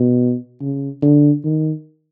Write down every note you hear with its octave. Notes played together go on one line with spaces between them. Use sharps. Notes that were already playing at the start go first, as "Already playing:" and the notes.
Already playing: B2
C#3
D3
D#3